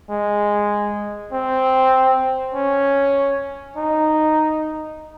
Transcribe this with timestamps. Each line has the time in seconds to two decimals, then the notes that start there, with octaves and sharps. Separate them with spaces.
0.10 G#3
1.33 C4
2.55 C#4
3.77 D#4